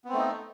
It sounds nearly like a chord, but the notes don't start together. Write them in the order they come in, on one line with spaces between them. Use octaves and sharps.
B3 C4 A3 D#4